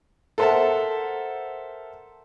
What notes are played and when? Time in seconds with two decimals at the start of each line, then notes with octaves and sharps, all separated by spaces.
0.38 A4 A#4 C5 E5 F#5 A5